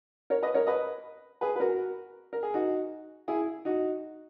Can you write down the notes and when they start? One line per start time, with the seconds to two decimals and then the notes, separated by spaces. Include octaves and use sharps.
0.30 A#4 C#5
0.43 B4 D#5
0.54 A#4 C#5
0.67 B4 D#5
1.41 G#4 B4
1.56 B4
1.60 F#4 A#4
2.33 A#4
2.43 G#4
2.54 D#4 F#4
3.28 E4 G#4
3.65 D#4 F#4